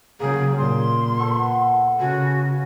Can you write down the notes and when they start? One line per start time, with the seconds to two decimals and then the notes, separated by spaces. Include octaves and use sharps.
0.20 C#3 F#3 A#3 G#4 G5
0.58 A#2 C6
1.19 B3 A4 F#5
2.00 C#3 F#4 G#5